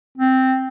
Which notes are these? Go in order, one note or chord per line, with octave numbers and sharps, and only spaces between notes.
C4